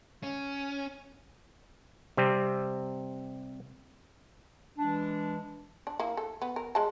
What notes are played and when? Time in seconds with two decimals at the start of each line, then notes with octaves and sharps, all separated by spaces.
0.23 C#4
2.17 C3 G3 C4
4.78 E3 G#3 D4
5.87 D4
6.00 A#3 E4
6.17 A4
6.42 B3
6.56 A#4
6.75 G#3 A5